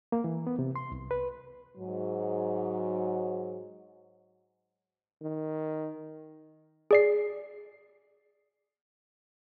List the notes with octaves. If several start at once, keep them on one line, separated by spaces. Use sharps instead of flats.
A#3
E3
B3
C3
C6
C2
B4
G#2 F#3
D#3
G#4 D5 C7